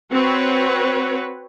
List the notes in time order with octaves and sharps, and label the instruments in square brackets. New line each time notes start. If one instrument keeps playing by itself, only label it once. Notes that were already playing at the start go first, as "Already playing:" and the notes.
[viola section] C4 F#4 B4 C#5